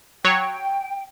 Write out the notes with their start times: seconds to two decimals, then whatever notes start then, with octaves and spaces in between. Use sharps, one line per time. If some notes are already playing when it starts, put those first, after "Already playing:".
0.24 F#3 C#5 G5